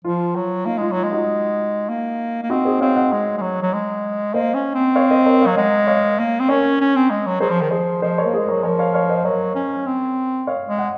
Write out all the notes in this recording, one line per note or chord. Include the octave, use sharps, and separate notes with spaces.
F3 F4
F#3
A#3 D#4
G#3 F4
F#3
G#3
D#4 F#4
A#3
A#3
C4 D#4 F#4
G#4 C5
C4 C#5 F5
D#5 F#5
G#3
G#3
F#3
F#3
G#3
A#3 C5 D#5
C#4
C4
C#5 F5
C5 D#5
A#4 C#5
F#3 C#5 F5
G#3 D#5 F#5
C#5 F5
A#3
C4
C#4 A#4 C#5
C#4
C4
G#3
F#3
F#3 G#4 C5
F3
D#3
F3 G#4 C5
F3 C5 D#5
A#4 C#5
A#3
G#3 G#4 C5
F#3 A#4 C#5
F3 A#4 C#5
C#5 F5
C#5 F5
C5 D#5
F#3 A#4 C#5
C#4
C4
C#5 F5
G#3
D#5 F#5